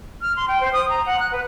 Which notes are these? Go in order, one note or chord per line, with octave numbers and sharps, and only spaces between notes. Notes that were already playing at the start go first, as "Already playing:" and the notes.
F6
C6
G5
C5
D#6
A#5
F#5
F#6
B4